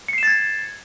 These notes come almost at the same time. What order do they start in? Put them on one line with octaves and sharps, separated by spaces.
C#7 C7 E7 A6 G#6